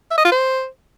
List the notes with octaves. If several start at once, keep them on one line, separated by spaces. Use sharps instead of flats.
E5
D#5
F4
C5